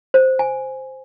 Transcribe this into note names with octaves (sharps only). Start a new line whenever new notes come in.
C5
G#5